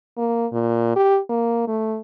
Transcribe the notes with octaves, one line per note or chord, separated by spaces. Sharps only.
A#3
A#2
G4
A#3
A3